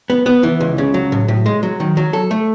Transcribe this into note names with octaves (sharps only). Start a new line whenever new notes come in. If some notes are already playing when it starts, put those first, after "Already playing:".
B3
B3
E3
C#2
C#3
F#3
A2
A2
G#3
F#3
D#3
F#3
A4
A3